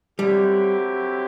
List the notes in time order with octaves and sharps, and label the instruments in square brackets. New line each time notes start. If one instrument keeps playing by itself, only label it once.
[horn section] D3 F#3 C4 E4 G4 [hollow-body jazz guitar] G3